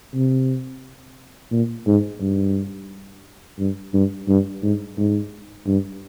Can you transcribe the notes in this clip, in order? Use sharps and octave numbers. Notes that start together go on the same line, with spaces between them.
C3
A#2
G#2
G2
G2
G2
G2
G#2
G#2
G2